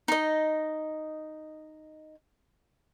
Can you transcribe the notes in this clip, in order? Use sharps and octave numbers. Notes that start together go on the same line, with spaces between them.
D#4 D#5